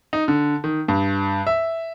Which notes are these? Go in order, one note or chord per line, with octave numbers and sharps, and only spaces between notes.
D#4
D3
D#3
G2
E5